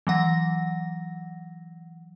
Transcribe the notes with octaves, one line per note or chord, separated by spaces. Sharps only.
E3 F#3 F#5 A#6